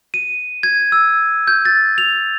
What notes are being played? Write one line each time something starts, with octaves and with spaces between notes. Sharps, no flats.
D#7
G#6
E6
G6
A6
F7